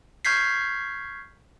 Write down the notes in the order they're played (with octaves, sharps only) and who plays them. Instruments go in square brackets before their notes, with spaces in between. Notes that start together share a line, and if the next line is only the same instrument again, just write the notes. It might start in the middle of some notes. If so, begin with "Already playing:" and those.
[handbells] C#6 F6 G6 G#6 B6 C7